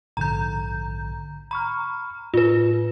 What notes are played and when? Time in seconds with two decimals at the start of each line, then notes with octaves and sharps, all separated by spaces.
0.17 A#1 G#2 D3 A#5 G6
1.51 A#5 B5 C#6 F6
2.34 A2 F4 B4